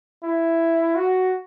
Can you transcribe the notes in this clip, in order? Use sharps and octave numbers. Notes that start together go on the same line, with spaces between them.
E4
F#4